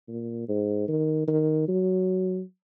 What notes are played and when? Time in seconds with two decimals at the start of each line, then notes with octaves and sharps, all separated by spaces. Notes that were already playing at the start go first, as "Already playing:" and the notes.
0.08 A#2
0.49 G#2
0.88 D#3
1.28 D#3
1.69 F#3